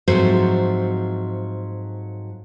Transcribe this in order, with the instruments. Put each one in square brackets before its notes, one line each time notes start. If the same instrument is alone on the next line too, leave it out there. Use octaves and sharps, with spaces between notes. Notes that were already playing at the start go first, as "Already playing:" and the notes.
[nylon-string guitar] G#2 F3 F#3 A3 C4 C5